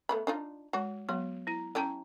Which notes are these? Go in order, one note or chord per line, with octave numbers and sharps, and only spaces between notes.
A3 B3 B5
D4 D#4 F4
G#3 F#4 F#5
F#3 B3 F#4
E4 A#5
C#4 E4 G4 A5 A#5